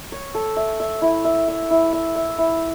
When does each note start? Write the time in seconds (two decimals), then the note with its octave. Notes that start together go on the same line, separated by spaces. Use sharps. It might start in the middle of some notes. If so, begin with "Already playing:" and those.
0.12 C#5
0.35 A4
0.57 E5
0.80 E5
1.02 E4
1.25 E5
1.48 E5
1.71 E4
1.93 E5
2.16 E5
2.38 E4